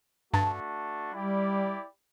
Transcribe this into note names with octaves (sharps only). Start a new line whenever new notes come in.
G2 A3 D4 F#4 A5
G3 E4 G4 D5